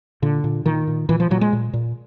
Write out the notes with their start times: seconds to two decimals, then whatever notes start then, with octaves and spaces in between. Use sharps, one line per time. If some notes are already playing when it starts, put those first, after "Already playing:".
0.22 A#2 D3
0.44 A#2
0.66 A#2 D#3
0.87 A#2
1.09 A#2 E3
1.20 F3
1.31 A#2 F#3
1.41 G#3
1.53 A#2
1.73 A#2